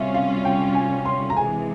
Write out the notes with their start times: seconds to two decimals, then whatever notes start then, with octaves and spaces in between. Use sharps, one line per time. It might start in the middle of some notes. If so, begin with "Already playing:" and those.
Already playing: C3 G3 C#4 F4 E5
0.14 F5
0.45 G5
0.75 G#5
1.05 C6
1.30 A#5
1.37 C3 E3 G#3 G#5